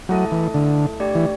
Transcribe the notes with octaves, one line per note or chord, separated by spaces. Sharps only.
F#3 A3 E4 A4 E5 A5
E3
D3
A3 D4 G4 D5 G5
E3